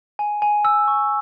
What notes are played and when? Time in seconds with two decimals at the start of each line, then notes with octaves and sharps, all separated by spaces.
0.19 G#5
0.42 G#5
0.65 E6
0.88 C#6